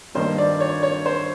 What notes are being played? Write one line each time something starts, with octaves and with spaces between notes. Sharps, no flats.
G2 D#3 G3 A#3 C5
D5
C#5
C#5
C5